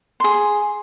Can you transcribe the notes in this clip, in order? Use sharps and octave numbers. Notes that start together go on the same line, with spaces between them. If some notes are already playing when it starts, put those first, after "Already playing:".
G#4 C6